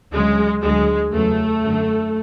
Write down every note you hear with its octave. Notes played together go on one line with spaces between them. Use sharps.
D2 C#3 F#3 G#3
D2 D3 F#3 G#3
E2 C#3 F#3 A3
F#2 D3 F#3